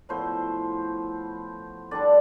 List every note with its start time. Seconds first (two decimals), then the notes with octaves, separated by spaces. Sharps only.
0.09 A2 F3 B3 E4 C5
1.91 D3 G3 D4 D5